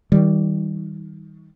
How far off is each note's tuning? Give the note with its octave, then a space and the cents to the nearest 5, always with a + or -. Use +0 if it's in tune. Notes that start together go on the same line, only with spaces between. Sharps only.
D#3 +30 G3 -10